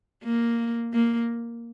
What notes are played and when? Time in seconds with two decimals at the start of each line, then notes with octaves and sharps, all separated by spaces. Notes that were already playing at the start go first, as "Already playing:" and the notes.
0.24 A#3
0.93 A#3